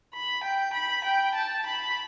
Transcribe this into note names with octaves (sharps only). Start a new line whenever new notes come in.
B5
G5
B5
G5
A5
B5